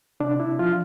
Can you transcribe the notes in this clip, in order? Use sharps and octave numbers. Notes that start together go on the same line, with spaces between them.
C3 D4
E4
F3 F4